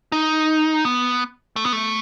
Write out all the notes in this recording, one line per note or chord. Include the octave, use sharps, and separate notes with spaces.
D#4
B3
A3
B3
A3